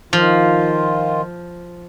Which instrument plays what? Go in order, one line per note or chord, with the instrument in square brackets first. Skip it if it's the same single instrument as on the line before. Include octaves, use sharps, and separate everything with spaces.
[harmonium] D#3 F4 [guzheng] F3